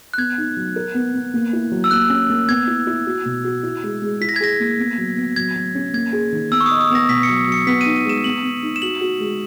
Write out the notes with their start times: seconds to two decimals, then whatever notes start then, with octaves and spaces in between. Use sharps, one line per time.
0.14 F#6
0.18 B3 G#6
0.38 D#4
0.57 F#3
0.76 A#4
0.94 B3
1.14 B3
1.34 A#3
1.53 E4
1.72 F#3
1.84 E6
1.91 A#3 F#6
2.10 C#4
2.30 A#3
2.49 B3 G#6
2.67 E4
2.87 E4
3.06 F#4
3.25 B2
3.44 F#4
3.63 E4
3.83 G#3
4.02 G#3
4.21 E4 B6
4.29 A#6
4.36 G#6
4.40 G#4 A#6
4.60 A#3
4.79 B3
4.98 F#3
5.17 B3
5.36 F#3 G#6
5.56 F#3
5.75 C#4
5.93 A#3 G#6
6.13 G#4
6.32 D#3
6.51 B3 E6
6.61 C#6
6.66 D#6
6.71 D#5
6.80 D#6
6.90 B3 A#6
7.09 B2 B6
7.23 C#7
7.29 F#3
7.47 F#3 C#7
7.67 B3 B6
7.81 D#4 D#7
7.96 D#7
8.05 G#3 E7
8.24 B3 F#7
8.43 B3
8.63 D#4
8.76 E7
8.82 F#4 F#7
9.01 F#4
9.20 G#3